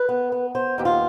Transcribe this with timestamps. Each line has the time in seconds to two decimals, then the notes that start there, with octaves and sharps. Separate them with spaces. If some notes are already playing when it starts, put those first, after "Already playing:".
Already playing: B4
0.09 B3
0.32 B3
0.55 B3 C5
0.78 D#2 G4
0.85 F4